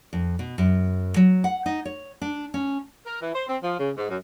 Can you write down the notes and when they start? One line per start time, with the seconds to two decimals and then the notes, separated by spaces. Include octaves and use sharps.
0.13 F2
0.39 B2
0.58 F#2
1.16 F#3
1.44 F#5
1.66 D#4
1.85 C#5
2.21 D4
2.54 C#4
3.07 A#4
3.21 E3
3.35 C5
3.48 C4
3.63 F3
3.80 C#3
3.97 G#2
4.10 F#2